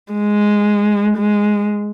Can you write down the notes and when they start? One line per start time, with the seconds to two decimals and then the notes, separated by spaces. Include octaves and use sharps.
0.13 G#3
1.17 G#3